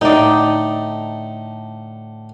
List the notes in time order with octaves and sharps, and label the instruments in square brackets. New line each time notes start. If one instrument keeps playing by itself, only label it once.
[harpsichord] A2 D3 [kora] D#4 D5